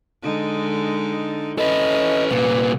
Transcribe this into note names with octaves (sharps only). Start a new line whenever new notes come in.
D3 G#3 D#4
E3 C#4 A4 B4 D#5
C2 A#2 B4